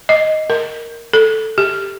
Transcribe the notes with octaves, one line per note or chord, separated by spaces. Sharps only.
D#5
A#4
A4
G4